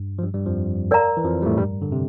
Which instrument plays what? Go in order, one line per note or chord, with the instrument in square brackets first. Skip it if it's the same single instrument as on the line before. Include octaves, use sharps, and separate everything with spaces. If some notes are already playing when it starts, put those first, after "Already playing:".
Already playing: [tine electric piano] G2
F3
G2 G3
G2 G3
F2 F3
[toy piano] A#4 D5 F5 A#5
[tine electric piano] E3
F2 F3
G3
A2 A3
G2 G3
D3
C3